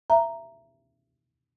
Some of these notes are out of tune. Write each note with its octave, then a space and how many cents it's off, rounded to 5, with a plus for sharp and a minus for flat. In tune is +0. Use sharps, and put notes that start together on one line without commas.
E5 +20 A#5 +0